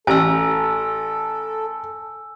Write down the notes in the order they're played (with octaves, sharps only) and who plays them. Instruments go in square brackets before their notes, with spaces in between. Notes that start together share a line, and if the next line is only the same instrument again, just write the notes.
[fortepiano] A1 [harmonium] A4 [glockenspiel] G#5 E6